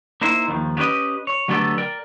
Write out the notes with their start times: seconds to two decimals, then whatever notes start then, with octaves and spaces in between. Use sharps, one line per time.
0.21 A#3 D#4 E4 C5
0.48 D#2 D#3 F3
0.77 B3 C#4 G4 B4 D#5
1.27 C#5
1.48 D3 F#3 A3 B3 G4 A4
1.78 A#4 D5 G5